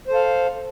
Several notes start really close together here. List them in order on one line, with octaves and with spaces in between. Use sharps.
C5 A4 F5